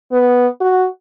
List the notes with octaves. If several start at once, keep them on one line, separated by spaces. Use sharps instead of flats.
B3
F#4